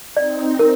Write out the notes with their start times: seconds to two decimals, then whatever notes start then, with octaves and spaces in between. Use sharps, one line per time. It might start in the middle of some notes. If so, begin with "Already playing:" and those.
0.16 C4 D#4 D5
0.59 A#4